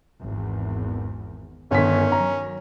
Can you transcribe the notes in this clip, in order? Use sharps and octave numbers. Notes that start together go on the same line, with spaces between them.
G#1 E2
G1 D3 D#3 C#4 G#5 B6
D#3 F#3 A#5